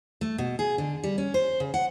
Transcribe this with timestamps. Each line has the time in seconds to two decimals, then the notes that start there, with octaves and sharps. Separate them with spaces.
0.21 A3
0.38 B2
0.59 G#4
0.78 D3
1.04 G3
1.18 C#4
1.34 C5
1.60 C#3
1.74 F#5